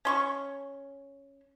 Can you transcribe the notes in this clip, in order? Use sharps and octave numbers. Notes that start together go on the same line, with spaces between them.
C#4 C6 C#6